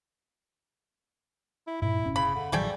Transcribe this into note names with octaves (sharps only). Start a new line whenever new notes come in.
E4
G2 A#2 E4
F1 C#4
C#3 B5
D3
A1 D#3 F#3 G3 A3 G#4 G5